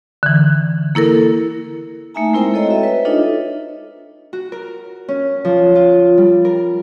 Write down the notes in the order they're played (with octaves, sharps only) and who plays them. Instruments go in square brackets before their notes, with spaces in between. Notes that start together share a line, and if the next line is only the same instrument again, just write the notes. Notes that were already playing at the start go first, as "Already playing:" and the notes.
[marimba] D3 E3
A#3 E4 A4 A#4
[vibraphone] A3 A#3 D#4 E5 G#5 A#5
G#3 C4 E4 A#4 C5 G5
A4 C5 C#5 D#5 G5 A#5
F#4 E5
B4 E5
D4 D#4 F4 A4 C#5 D#5
[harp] F#4
A#4
C#4
F3
F4
G3
A#4